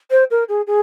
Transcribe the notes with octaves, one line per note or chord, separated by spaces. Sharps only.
C5
A#4
G#4
G#4